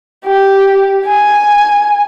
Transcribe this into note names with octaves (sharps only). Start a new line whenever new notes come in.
G4
G#5